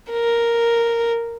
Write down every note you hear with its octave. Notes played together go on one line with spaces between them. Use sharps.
A#4